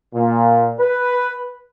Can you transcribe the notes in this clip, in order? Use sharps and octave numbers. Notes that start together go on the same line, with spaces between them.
A#2
B4